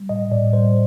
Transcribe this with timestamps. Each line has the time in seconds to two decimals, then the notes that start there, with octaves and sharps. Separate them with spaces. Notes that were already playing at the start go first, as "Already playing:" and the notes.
Already playing: G3
0.09 A2 D#5
0.32 A2 D5
0.53 G3 C5